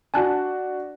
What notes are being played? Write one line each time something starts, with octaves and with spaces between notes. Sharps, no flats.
D4 F#4 G#5 A5 F#6